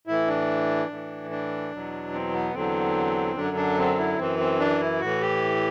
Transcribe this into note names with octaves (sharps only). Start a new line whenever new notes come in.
A2 E3 E4
D4
A2 E3
D4
E2 B2 F#3
C4
B3
E2 D3 F#3 C4
F#2 D3 F#3 D4
D4
C4
E4
F#2 E3 C4
C4
D4
E4
A2 E3 F#4
G4